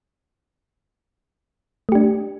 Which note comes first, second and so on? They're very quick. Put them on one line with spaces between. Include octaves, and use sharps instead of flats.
A3 G4 D4